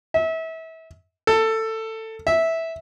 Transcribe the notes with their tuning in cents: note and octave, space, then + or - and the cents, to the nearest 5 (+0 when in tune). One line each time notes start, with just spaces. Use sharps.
E5 -30
A4 +15
E5 -10